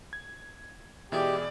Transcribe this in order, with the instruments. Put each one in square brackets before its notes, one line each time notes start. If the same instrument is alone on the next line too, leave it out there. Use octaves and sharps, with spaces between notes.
[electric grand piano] G#6
[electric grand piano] B2 E3 [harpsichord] G#3 E4 [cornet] G4 [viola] D5